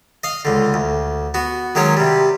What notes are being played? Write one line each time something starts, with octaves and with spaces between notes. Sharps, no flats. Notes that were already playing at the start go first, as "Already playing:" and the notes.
D#5 F5
C#2 D3
D2
B3 F#4
D#3 F#3 G#3 C#4 C#5
C3 G3